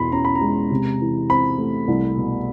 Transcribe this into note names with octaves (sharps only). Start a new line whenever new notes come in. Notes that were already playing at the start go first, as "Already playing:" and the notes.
Already playing: E2 B2 B5 C6
C#4 A#5
B5
A#5
G#3
C3
E3
C4 B5
A3
C2
B2